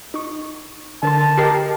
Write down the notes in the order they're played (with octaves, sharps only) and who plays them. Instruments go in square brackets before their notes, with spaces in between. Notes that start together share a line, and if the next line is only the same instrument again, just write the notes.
[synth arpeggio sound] D#4 C#6
[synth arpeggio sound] D3 A#4 C6 [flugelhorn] A5
[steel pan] G4 A#4 D#5 [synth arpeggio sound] C7